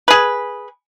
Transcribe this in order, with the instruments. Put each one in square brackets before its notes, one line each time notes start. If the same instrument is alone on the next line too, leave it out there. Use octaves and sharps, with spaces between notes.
[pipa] G#4 B4